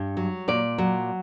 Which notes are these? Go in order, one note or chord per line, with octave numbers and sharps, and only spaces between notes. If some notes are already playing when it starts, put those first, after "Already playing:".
Already playing: G2
F#3
A#2 D5
F#3